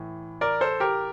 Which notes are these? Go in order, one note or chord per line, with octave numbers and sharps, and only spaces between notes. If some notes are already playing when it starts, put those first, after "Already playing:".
Already playing: A2 E3
A#4 D5
A4 C5
G4 A#4